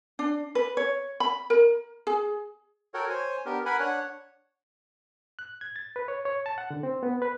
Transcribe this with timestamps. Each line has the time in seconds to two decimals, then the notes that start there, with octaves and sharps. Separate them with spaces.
0.19 D4
0.55 B4
0.77 C#5
1.20 B5
1.50 A#4
2.07 G#4
2.94 F#4 A4 A#4 C#5 F#5 G5
3.09 C5 C#5 G#5
3.46 B3 D4 G4 A#4
3.66 A#4 B4 F#5 G#5 B5
3.80 D4 C#5 F#5
5.39 F#6
5.61 G#6
5.76 A6
5.96 B4
6.08 C#5
6.25 C#5
6.46 A5
6.58 F#5
6.71 D3
6.83 C4
7.03 B3
7.22 B4